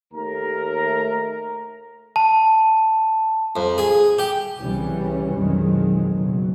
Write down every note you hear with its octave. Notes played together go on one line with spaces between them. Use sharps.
D#2 A3 A#4 A#5
A5
F2
G#4
G4
C2 C#3 E3 G3 C#4
B1 F2 D#3 F#3 G#3
F#1 B2 F#3